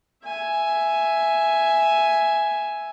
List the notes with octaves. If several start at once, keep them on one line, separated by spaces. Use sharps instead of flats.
E5 G#5